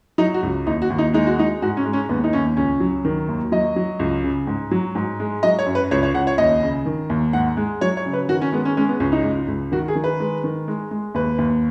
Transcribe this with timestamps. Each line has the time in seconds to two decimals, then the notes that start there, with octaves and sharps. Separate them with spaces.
0.18 F#3 D#4
0.34 F#4
0.43 C#2
0.66 D#2 D#4
0.82 F#4
0.90 D#2
0.98 D#4
1.14 G#3 D#4
1.27 F#4
1.37 G#3 D#4
1.62 G#2 F#4
1.77 C#4
1.85 G#3
1.93 C#4
2.09 D#2 B3
2.24 D#4
2.33 D#2 C#4
2.57 C#2 C#4
2.80 F#3
3.05 D#3
3.28 D#2
3.52 F#3 D#5
3.76 F#3
3.99 C#2
4.24 C#3
4.47 G#2
4.71 F#3
4.95 G#2
5.20 G#3
5.43 F#3 D#5
5.59 C#5
5.66 F#2
5.75 B4
5.91 C#2 C#5
6.03 C#5
6.14 C#2 F#5
6.27 C#5
6.38 D#2 D#5
6.63 C#3
6.86 D#3
7.10 D#2
7.33 G#2 F#5
7.57 G#3
7.81 F#3 C#5
7.97 C#5
8.06 C#3
8.13 B4
8.29 D#3 F#4
8.42 C#4
8.52 G#3 B3
8.65 C#4
8.77 G#3 C#4
8.89 B3
9.00 C#2 C#4
9.12 D#4
9.24 C#2
9.48 C#2
9.72 D#3 F#4
9.88 G#4
9.96 D#3
10.04 B4
10.20 G#3
10.44 D#3
10.68 G#3
10.91 G#3
11.14 D#2 B4
11.38 D#2